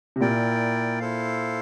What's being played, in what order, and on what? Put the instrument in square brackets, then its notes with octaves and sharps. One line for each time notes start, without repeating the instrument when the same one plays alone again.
[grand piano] C3
[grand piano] A#2 [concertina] E4 A#4 D5 G5
[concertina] E4 A4 C5 F5